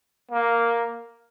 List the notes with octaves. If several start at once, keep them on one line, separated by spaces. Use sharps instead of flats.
A#3